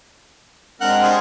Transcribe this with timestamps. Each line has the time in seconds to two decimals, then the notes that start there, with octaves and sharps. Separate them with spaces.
0.81 G#3 C4 D4 A#4 F#5
1.02 G3 G#4 C5